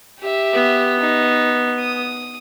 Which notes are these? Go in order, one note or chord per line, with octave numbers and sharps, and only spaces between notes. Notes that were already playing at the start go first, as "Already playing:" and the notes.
G4 E5
B3
D#4
D#6